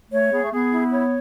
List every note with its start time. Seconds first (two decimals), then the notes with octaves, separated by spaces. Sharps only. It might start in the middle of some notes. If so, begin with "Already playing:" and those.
0.11 A3 C#5
0.32 B3 G#4
0.42 A3
0.52 B3 G#4
0.71 E4
0.91 C#5